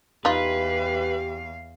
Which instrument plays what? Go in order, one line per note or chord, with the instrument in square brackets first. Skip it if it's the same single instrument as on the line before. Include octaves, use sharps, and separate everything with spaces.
[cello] E2 F5 [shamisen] D#4 F4 [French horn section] G4 [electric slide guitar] B4